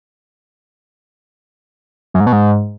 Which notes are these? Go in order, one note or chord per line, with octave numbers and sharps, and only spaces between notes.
F#2
G#2
B2
G#2